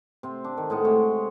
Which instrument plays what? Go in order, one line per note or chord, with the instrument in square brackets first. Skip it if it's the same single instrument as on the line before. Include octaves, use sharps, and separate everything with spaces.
[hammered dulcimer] C3 C4
D4
D#3
A2 G#3 D#5 F#5
C3 G#3 C#5